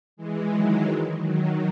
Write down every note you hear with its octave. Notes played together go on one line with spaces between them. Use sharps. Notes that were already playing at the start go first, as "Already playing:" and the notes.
E3 G#3
D#3 F#3
D#3 F#3